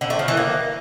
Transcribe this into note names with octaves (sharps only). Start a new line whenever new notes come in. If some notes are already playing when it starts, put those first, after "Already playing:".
D3
A3
F3
E3
A#3